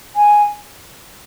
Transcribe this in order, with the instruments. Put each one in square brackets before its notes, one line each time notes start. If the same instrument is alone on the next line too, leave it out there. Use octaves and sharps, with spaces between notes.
[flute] G#5